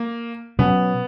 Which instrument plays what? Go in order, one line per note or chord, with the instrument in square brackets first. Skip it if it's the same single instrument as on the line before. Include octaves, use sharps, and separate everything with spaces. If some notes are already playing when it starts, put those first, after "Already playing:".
Already playing: [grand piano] A#3
[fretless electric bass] B2 F#3 C#4 [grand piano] B3